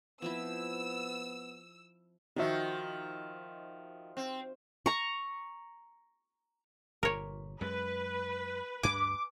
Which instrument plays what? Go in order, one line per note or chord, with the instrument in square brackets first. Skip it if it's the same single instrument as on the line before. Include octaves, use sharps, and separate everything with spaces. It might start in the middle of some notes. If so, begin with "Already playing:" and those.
[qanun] F3 C4 E4 [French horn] B3 [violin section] E6
[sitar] D#3 F3 [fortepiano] D#4 F#4 E5
[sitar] C4
[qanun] A#5 C#6
[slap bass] G1 A#2 [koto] A#4 C#5
[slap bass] F#2 G#3 [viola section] B4
[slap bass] D2 G2 D4 [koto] G#5 [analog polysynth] D6